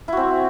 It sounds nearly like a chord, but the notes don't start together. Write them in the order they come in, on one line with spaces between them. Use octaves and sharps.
E4 F#4 C4